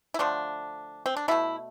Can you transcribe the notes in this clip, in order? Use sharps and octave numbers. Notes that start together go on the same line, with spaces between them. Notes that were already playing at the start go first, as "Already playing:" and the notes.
E4
D3 F3 A3 D4
C4
D4
B2 A3 E4